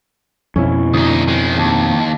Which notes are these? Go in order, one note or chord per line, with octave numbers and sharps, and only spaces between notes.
F2 B2 C#4 E4
D2 D#4 D#6
D#3 G#3
D#2 G#5 A5